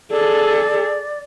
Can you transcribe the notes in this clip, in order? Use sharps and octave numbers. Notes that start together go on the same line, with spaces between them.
G#4 A4 D5